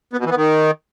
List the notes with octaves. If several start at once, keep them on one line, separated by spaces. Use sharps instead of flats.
B3
B2
E3
B3
D#3